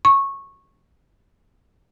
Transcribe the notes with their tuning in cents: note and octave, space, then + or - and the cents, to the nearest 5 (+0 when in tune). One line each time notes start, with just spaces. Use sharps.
C#6 -15